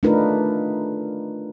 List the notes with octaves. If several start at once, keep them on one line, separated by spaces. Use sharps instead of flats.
A3 D4 D#4 F4 A#4 B4